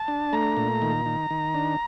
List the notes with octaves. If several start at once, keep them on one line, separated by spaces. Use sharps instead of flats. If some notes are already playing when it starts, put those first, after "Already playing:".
Already playing: A5
D4
A3 A#5
A#2
D#3
D#3
D#3
D4